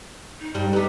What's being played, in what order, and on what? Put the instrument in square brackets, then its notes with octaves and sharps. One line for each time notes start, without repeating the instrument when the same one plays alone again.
[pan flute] D#4
[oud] G2 G3
[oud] B3 D#4 [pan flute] G4